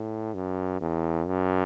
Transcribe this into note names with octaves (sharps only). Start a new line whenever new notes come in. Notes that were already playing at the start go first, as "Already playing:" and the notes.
Already playing: A2
F#2
E2
F#2